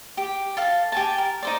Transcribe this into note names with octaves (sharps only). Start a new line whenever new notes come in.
G4
A4 F5 A5
G4 G#5 A5
A#4
D#4 C5 D5